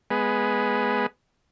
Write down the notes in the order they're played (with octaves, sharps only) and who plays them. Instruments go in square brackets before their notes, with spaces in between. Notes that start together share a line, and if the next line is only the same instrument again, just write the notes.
[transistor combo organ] G#3 B3